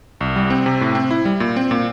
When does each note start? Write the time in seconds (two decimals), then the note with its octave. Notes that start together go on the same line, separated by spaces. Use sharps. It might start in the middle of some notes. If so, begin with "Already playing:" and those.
0.21 C2
0.36 G3
0.50 C4
0.66 C3
0.81 A2
0.95 C4
1.11 E4
1.25 G3
1.40 A#2
1.56 C4
1.71 A#2